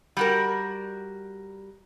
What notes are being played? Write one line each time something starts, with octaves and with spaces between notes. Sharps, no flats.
G3 F#4 A#4